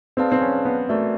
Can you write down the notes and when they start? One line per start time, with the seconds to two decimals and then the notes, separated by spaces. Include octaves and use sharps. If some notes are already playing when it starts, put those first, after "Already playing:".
0.17 C4 G#4 B4 D5 F5 A5
0.32 C4
0.41 C#4
0.65 B3
0.89 A3 F#4 A#4 D5